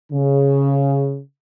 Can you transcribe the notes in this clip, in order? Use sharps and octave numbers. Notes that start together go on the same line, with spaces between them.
C#3